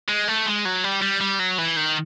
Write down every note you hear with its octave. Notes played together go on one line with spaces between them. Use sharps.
G#3
A3
G#3
F#3
G3
G3
G3
F#3
E3
D#3